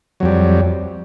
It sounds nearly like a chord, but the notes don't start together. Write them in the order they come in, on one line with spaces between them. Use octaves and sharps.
F#3 F2 G3